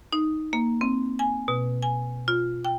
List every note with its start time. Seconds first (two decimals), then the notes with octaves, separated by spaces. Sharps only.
0.13 D#4
0.53 A#3
0.81 C4
1.19 G#5
1.48 B2
1.83 G#5
2.28 F4
2.65 G5